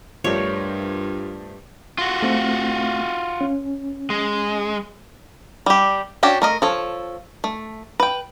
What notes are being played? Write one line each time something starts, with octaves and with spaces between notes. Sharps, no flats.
G2 F3 A3 D4 F4 G4 A#4 C#5
F4 F#4
A3 C4
C#4
G#3
G3 G4
C#4 D4 F#4 G4
A3 A#4 D#5
F3 A4 C#5
A3
B4 G5